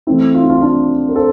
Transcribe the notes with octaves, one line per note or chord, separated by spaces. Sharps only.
E3 A3 C4 E4
F4
E4
D4 F4
D4 F4
A#4
A4 C5